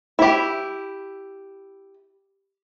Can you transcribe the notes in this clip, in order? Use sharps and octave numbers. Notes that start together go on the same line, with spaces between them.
E4 G4